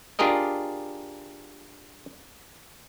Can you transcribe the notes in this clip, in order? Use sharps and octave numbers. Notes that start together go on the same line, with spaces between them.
D4 F4 G4 G#4 A#4 D#5